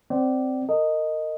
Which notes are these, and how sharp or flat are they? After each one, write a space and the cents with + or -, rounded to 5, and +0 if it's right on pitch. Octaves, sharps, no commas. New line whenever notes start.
C4 +0 D5 +0 G5 -45
A#4 -30 D#5 +0